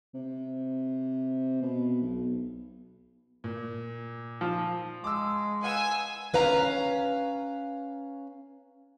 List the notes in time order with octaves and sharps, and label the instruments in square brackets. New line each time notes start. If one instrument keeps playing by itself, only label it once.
[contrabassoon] C3
B2
B1
[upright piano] A#2
[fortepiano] F3
[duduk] G#3 [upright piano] D6 E6
[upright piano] B4 F5 F#5 [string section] G#5 E6
[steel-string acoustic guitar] C#4 B4 F5 A#5